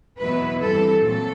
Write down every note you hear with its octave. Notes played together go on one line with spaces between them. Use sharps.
E2 B2 F#3 B3 E4 B4
G2 E3 G3 C4 A4
A#2 F#3 A4